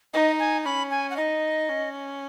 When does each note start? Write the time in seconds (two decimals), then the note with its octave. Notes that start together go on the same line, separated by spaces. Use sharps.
0.14 D#4 D#5
0.39 G#5
0.65 C#4 B5
0.91 G#5
1.10 F#5
1.17 D#4 D#5
1.69 C#4